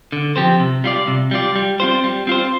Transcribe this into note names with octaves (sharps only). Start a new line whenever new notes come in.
D3
F3 C4 G4 C5
C3
G3 F4 D5
C3
G3 F4 D5
G3
C4 F4 C5
G3
C4 F4 C5